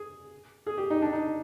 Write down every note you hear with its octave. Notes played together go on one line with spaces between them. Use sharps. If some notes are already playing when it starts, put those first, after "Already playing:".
Already playing: G#4
G#4
G4
D#4
D4
D#4